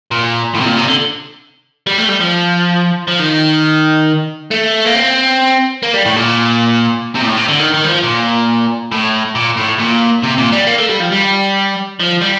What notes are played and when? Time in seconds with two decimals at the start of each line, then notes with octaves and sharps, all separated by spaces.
0.11 A#2
0.55 A2
0.61 C3
0.66 A#2
0.77 C3
0.88 D3
1.87 G3
1.98 A3
2.09 G3
2.20 F3
3.07 F3
3.19 D#3
4.51 A3
4.85 A#3
4.95 C4
5.83 A#3
5.94 G3
6.05 A2
6.16 A#2
7.15 C3
7.21 A#2
7.26 A2
7.37 C3
7.48 D3
7.59 D#3
7.74 D#3
7.84 G3
7.88 F3
8.03 A#2
8.91 A2
9.35 A#2
9.57 A2
9.79 A#2
10.23 C3
10.38 A#2
10.53 G3
10.67 A#3
10.78 A3
10.89 G3
11.00 F3
11.12 G3
12.00 F3
12.21 G3